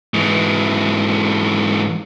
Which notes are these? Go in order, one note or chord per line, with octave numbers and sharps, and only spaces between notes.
G#2 E3